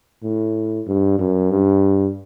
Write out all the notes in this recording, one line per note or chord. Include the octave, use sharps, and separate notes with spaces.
A2
G2
F#2
G2